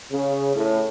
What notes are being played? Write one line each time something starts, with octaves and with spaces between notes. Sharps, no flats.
C#3
A2